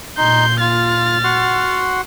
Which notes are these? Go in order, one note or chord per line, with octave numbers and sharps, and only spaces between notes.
A#2 D#4 C6 G6
F4 F6 A6
F#4 F#5 C6